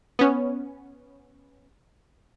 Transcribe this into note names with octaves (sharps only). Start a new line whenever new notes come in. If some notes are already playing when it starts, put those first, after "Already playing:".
B3 C#4